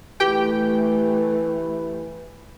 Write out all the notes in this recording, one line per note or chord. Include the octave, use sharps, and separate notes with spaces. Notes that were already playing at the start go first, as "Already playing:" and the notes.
E3 A3 G4 G5